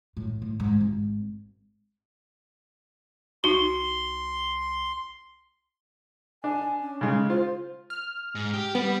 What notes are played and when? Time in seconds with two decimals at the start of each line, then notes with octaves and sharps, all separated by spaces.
0.17 A2
0.42 A2
0.60 G#2
0.81 G#1
3.44 C2 D#4 F#4 C6 G7
6.44 D4 G#5
6.81 C#4
7.01 C#3 G#3
7.30 F4 C5
7.90 F6
8.35 G#2
8.54 G4
8.75 G3 B3